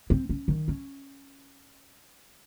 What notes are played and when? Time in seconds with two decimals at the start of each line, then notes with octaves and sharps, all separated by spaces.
0.10 C4
0.29 C#4
0.48 D#3
0.68 C#4